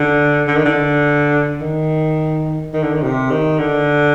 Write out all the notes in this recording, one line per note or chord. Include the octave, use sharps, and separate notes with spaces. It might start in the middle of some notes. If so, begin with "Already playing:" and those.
Already playing: D3
D3
D#3
D3
D#3
D#3
D3
D#3
C3
D#3
D3